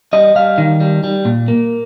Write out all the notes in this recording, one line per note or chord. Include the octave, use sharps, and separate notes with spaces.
G3 D#5
G3 F5
D#3
G3
G3
A#2
A#3